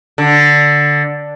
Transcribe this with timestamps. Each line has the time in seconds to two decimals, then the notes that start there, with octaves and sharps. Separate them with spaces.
0.18 D3